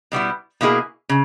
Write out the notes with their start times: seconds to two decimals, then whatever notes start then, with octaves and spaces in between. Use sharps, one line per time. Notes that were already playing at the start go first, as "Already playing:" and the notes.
0.12 B2 G3 B3 E4
0.61 B2 A#3 E4 G#4
1.09 C#3